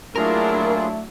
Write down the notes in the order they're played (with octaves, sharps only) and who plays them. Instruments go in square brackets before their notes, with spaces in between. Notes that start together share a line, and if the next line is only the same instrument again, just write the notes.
[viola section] F#3 D4 E4 [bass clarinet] A3 [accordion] A#3 F4 G#4 [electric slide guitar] A#4